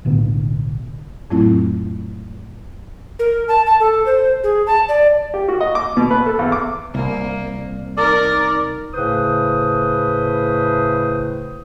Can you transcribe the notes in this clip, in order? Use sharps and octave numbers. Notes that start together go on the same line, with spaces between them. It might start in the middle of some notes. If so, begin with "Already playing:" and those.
B1 A2 D3 B3
F2 A2 F#3 A3 C4 E4
A#4
A5
A5
A4
C5
G#4
A5
D5
G4
F#4
D#5
D6
B2
B4
A4
E2
D6
C2 A#3
D#4 A#4 D5
A2 C#3 A3 B4 C5 D#6